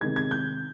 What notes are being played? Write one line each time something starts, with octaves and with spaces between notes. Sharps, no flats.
C3 D#3 G#3 G#6
G#6
G6